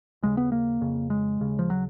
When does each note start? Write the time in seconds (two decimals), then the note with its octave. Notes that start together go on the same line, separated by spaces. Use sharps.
0.23 D#2 C#3 G#3
0.37 B3
0.52 A#3
0.81 F2 C#3
1.10 G#3
1.40 D#2 C#3
1.59 F3
1.70 F#3